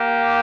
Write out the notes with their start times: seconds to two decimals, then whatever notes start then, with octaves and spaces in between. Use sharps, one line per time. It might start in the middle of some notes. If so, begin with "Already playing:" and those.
Already playing: A#3 G4